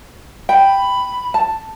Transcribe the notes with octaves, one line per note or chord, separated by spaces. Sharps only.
G5 B5
A5